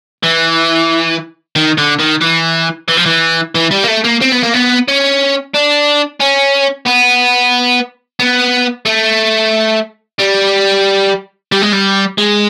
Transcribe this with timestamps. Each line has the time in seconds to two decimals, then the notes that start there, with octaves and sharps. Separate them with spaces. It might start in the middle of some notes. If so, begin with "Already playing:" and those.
0.23 E3
1.56 D#3
1.78 D3
2.00 D#3
2.22 E3
2.88 E3
2.97 F3
3.06 E3
3.55 E3
3.71 G3
3.84 A#3
3.88 A3
4.04 A#3
4.22 C4
4.32 B3
4.43 A#3
4.54 B3
4.88 C#4
5.54 D4
6.21 C#4
6.86 B3
8.20 B3
8.86 A3
10.19 G3
11.52 G3
11.61 G#3
11.73 G3
12.18 G#3